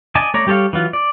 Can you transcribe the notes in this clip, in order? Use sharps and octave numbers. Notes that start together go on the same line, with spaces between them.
D5 D#5 G#5 A5
A3 C#5 D5 A#5
G3 G4 A4 C#5 F5
E3 F#3 F4
D5